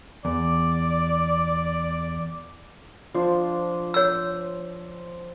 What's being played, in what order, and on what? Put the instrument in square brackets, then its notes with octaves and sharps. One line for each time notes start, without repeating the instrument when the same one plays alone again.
[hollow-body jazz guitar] E2 [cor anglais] D5
[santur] F3 D4 C5
[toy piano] C#5 E6